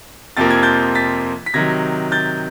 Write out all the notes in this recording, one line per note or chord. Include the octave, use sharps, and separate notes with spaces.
F2 C3 F3 A#3 A6
G#6
G6 A6
A6 B6
B6
C3 D#3 F#3 G#6 A#6
G6 A6